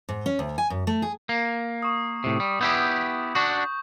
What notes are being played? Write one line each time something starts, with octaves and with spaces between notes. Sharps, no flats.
G#2
C#4
D2
G#5
F#2
A3
G#4
A#3
C#6 D#6
A2 C3
G3
B3 E4 G4 G6
D4 F#4 C#6